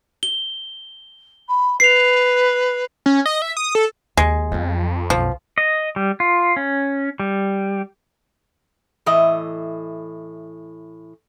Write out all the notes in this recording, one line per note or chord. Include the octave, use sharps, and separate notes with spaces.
G7
B5
B4 C7 F7
C#4
D#5
E5
D#6
A4
D#2 G#3
F2 F#3 B3
B1 F#2 F3
D#5
G3
F4
C#4
G3
A2 E3 D#5 E5